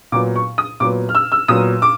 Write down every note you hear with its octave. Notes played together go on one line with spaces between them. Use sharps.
A#2 F#3 B3 D6
C#6
D#6
A#2 F#3 B3 D6
F6
E6
E6
A#2 F#3 B3 D#6
D6